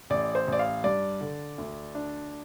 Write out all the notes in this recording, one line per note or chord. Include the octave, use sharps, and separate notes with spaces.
A1 D5
C5
A1
D5
F5
G2 D5
D3
D2
D4